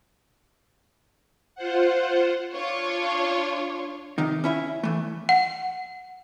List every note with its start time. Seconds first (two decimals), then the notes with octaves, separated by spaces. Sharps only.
1.55 F4 C5 F#5
2.53 D4 F4 C#5
4.18 C3 D#3 D#4
4.44 C#4 E4 E5
4.83 E3 A3
5.29 F#5